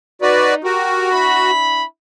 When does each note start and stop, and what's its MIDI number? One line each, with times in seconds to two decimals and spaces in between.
0.22 0.62 63
0.22 0.54 66
0.22 0.54 71
0.22 0.54 74
0.64 1.51 66
0.64 1.08 67
0.64 1.08 70
1.11 1.83 62
1.11 1.83 64
1.11 1.83 83